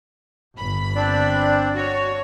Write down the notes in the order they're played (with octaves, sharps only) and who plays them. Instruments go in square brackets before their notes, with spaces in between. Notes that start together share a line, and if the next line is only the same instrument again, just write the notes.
[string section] G1 B5
[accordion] C4 D4 D5
[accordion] F#4 [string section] C#5